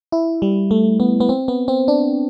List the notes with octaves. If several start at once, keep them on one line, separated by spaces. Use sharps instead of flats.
E4
G3
A3
B3
B3
C4
B3
C4
D4